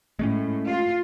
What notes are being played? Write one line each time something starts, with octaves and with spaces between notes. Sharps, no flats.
A2 G#3 A3 C#4
F4